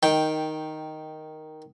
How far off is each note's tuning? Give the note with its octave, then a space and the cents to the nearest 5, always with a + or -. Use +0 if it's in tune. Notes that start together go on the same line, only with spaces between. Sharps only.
D#3 +0 G5 +0